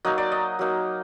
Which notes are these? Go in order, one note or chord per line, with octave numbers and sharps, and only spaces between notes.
F#3 A#3 D#4 D#5
D5
D#5
F#3 A#3 D#4